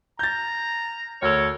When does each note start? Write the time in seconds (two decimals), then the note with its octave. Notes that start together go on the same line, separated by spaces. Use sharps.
0.19 A#5 G6 A6
1.22 D2 A4 A#4 C#5